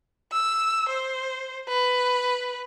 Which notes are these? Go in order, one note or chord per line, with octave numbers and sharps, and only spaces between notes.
E6
C5
B4